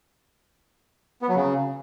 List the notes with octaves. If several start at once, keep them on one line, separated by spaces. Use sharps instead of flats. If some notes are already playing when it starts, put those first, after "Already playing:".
B3
F#3
C#3